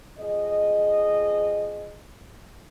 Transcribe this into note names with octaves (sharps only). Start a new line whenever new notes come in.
F2 G#4 D#5